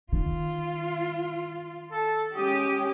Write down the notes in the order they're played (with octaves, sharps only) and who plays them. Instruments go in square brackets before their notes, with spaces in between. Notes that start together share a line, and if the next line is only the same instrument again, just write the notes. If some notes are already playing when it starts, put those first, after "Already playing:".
[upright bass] D#3 [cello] F4
[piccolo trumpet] A4
[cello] G#3 C#4 [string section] G4 [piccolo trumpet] D#6